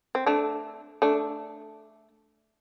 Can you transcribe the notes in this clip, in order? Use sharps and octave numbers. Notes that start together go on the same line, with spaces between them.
C4
A3 D4
A3 D4